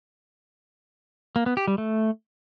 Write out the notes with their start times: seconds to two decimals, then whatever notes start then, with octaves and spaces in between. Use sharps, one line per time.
1.36 A#3
1.46 B3
1.57 G4
1.67 G3
1.78 A3